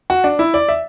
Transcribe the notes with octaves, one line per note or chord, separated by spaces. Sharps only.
F#4
D4
E4
D5
E5